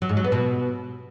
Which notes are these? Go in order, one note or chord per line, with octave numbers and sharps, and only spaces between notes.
F#3
G#2
F#3
B3
B2